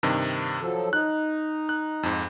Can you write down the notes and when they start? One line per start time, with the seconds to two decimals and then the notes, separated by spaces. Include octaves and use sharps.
0.03 G2 C3 D#3
0.61 F3 F#3 A4
0.93 D#4 F#6
1.69 F#6
2.03 F2 G#2